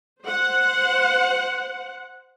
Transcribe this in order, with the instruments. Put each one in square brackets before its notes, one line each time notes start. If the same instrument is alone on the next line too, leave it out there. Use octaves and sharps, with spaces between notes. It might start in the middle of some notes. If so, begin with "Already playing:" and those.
[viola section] C5 F#5